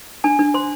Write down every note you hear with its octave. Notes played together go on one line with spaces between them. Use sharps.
D4 G#5
D4
C5 C6